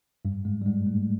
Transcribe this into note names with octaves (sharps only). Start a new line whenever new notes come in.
G2 G3
G#2 G#3
G3
G#2 G#3
A2 A3